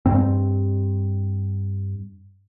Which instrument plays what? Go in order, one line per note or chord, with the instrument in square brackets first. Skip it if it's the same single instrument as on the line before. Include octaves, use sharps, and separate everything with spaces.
[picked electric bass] G2 C4